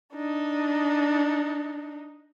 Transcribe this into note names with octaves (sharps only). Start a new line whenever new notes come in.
D4 D#4